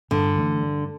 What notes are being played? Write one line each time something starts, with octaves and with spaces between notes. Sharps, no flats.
G2 D3
E3 A3 D4
G2